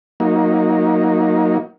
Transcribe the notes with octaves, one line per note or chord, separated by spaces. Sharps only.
F#3 A#3 D#4